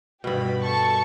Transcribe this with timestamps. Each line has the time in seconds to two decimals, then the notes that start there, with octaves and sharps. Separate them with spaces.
0.24 G2 B2 G4 B5
0.63 A4 A5 C#6